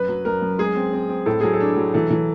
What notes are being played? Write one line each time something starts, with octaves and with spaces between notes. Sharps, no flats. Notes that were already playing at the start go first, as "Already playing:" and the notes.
Already playing: F#2 B4
F#3
F#2 A#4
F#2
G#3 G#4
C4
C4
C4
A2 A4
F#3 G#4
A4
D4
F#3
E3 A4
E3